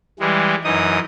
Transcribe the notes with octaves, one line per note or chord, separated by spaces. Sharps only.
E3 G3 G#3
F#2 E3 D#4 D#6